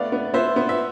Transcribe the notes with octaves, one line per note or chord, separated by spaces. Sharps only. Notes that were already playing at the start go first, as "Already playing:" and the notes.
Already playing: A3 B3 D5 F5
B3
B3 C5 E5
B3
E5